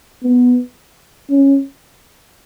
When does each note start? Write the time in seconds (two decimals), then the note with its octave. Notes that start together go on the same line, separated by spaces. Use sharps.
0.23 B3
1.30 C#4